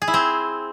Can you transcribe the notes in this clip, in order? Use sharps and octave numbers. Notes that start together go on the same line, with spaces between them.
G#4
E4
C4